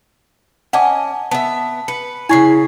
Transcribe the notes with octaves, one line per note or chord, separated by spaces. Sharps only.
C#4 D#5 F#5 G#5 A5 D6
B3 E5 A5
B4 C#7
C#3 C4 E4 G#5 C#6 C7